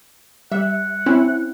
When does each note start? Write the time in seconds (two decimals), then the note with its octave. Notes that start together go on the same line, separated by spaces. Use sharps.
0.52 G3 E5 F#5
1.06 C4 C#4 E4